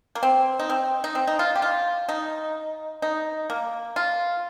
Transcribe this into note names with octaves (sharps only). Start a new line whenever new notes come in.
A#3
C4
D#4
C4
D#4
C4
D#4
F4
G4
F4
D#4
D#4
A#3
F4